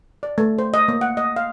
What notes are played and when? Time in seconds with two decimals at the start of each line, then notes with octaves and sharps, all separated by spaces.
0.23 D5
0.38 A3
0.59 C5
0.74 D#5
0.88 A#3
1.01 F#5
1.17 D#5
1.36 F5